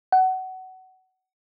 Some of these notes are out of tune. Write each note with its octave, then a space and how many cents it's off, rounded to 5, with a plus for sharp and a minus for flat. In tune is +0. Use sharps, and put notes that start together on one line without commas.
F#5 +20